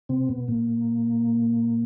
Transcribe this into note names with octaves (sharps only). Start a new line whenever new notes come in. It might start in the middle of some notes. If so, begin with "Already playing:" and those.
C3 C4
B2 B3
A#2 A#3